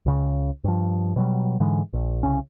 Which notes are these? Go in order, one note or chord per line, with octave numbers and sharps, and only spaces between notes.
C#2 C#3
G2 F3
B2 F#3 G3
G#2 D3 E3 G#3
A#1
C2 C#3 C#4